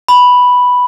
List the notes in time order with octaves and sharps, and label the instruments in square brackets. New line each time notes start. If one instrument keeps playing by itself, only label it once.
[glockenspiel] B5